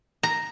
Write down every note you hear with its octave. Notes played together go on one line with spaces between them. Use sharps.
A#5